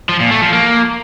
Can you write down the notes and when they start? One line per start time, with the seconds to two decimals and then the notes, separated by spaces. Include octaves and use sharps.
0.09 F3
0.20 A#2
0.31 A3
0.42 F3
0.53 A#3